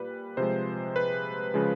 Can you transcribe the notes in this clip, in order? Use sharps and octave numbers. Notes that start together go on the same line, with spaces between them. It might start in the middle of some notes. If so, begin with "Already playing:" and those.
Already playing: A#2 G3 B4
C3 F3 G#3 C5
B4
C#3 F3 G#3